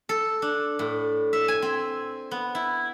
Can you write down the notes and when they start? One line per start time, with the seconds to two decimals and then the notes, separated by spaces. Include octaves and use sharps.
0.09 A4
0.42 D4
0.79 A2
1.33 E5
1.48 G#5
1.62 C4
2.31 B3
2.55 E4